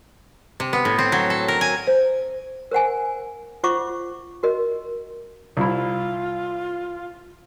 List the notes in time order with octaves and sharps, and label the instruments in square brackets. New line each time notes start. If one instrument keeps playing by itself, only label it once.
[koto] C3
B3
A2
C4
F#3
A4
A#4
G#5
[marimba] C5
[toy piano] A#4 C5 F#5 G#5
F4 C5 E5 F#5 C#6 D6
F#4 A#4 D#5
[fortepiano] C2 E4 [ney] F4